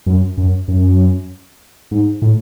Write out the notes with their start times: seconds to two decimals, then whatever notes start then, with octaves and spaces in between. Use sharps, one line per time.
0.06 F#2
0.38 F#2
0.68 F#2
1.91 G#2
2.22 A2